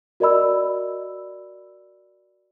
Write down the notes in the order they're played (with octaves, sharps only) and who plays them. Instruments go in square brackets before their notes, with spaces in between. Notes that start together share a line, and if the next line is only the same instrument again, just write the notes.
[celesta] F#4 A#4 D5 D#5 B5 E6